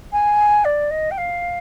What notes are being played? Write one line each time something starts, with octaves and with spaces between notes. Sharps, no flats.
G#5
D5
D#5
G5
F5